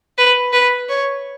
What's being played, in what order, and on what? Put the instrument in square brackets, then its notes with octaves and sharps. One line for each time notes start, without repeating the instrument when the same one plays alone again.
[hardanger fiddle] B4
B4
C#5